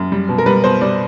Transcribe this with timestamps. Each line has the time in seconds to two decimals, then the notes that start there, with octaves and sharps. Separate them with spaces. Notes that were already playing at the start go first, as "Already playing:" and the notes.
Already playing: F#2
0.12 G3
0.29 B2
0.38 A#4
0.46 G3 B4
0.64 B2 C5
0.81 G3 D5